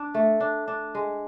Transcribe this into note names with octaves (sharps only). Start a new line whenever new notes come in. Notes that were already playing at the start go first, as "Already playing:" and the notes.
Already playing: D4
A3
D4
D4
G#3